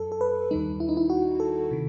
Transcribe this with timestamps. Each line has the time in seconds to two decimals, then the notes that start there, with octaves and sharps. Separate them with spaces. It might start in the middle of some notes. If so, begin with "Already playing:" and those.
Already playing: F#2 F#3 A4
0.12 A4
0.21 B4
0.51 D#2 D#3 G3 D#4
0.80 E4
0.89 D#4
0.97 E4
1.10 F#4
1.40 A4
1.71 C3 D#3